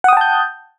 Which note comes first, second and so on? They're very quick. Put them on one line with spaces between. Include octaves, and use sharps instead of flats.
F#5 D#6 G5 A5 G6